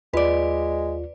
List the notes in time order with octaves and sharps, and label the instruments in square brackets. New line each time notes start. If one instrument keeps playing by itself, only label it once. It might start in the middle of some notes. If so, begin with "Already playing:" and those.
[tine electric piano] D#2 F4 [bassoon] G#3 [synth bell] B4 D5